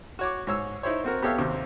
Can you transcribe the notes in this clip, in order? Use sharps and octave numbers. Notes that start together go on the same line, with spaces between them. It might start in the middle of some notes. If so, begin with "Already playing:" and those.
F#4 C#5 D6
G#2 C#5 E6
D#4 E4 C5 C#5
C4 F#4 A#4
B3 G4 A4 C#5 E5 F5
D#2 C3 C4